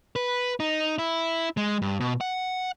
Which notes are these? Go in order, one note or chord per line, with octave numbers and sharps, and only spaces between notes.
B4
D#4
E4
G#3
G2
B2
F#5